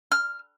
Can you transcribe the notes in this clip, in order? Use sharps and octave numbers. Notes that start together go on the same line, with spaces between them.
F6